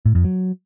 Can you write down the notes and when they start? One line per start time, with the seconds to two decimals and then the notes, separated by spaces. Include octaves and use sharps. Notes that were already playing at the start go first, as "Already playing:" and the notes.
0.06 A2
0.15 F2
0.24 F#3